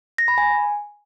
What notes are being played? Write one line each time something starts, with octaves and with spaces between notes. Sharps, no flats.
A#6
B5
G#5